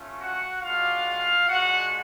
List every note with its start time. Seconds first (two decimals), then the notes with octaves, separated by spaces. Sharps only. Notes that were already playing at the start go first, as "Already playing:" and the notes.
Already playing: A3 C#4 F4
0.19 F#4 F#5
0.62 G#3 D4 F4 F#4 F5
1.48 G#3 D4 F4 F#4 F#5